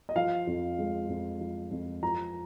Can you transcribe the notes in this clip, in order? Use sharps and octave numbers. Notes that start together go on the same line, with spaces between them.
D#5
F3 F5
F2
G#3
F2
F3
F2
F3 A#5